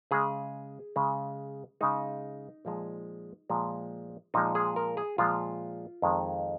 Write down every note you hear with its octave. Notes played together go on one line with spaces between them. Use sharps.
C#3 G#3 G#4
C#3 G#3
C#3 G#3 D#4
A#2 F3 G#3
A#2 F3 G#3
A#2 F3 G#3 D#4
G#4
A#4
G#4
A#2 F3 G#3 F4
F2 D#3 G#3